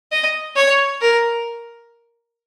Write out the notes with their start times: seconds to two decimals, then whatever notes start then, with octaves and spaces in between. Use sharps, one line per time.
0.12 D#5
0.56 C#5
1.01 A#4